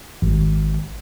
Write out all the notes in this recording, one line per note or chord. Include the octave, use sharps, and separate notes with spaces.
G#1